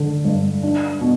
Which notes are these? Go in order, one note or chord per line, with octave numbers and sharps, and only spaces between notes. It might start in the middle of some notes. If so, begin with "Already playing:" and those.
Already playing: D3
G2
D4
B2